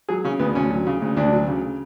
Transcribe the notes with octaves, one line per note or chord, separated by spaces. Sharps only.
F#3 G#4
C#3 C#4
D2 B3
D2 C#4
F#3
C#3
D2
D2 D4
F#3
C#3